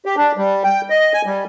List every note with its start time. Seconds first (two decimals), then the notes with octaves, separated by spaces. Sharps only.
0.06 G4
0.17 D4
0.37 G3
0.64 G5
0.90 D#5
1.13 G#5
1.26 G3